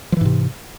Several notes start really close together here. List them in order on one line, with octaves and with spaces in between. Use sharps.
F3 E3 G#2 C3